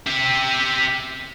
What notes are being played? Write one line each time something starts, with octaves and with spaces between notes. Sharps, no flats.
G4 E5